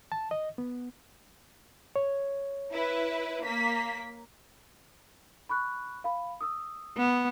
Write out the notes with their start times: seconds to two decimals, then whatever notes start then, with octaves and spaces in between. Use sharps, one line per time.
0.12 A5
0.31 D#5
0.58 B3
1.96 C#5
2.72 E4 B4
3.44 A#3 B6
5.49 B5 C#6 F#6
6.04 F5 B5
6.41 D#6 E6
6.97 B3